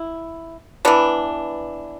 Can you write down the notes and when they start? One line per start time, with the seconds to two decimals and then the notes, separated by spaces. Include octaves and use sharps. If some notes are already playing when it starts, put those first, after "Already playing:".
Already playing: E4
0.85 E3 B3 D4